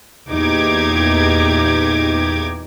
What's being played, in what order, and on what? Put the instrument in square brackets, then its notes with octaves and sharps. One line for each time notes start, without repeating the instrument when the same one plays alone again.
[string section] E2 A#2 D#4 G4 D6 G#6